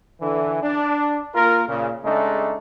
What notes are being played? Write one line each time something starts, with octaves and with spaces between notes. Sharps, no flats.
D3 E3
D4
A#3 F4 A#4
A#2 C#3
C#3 G#3 A3 D4 D#4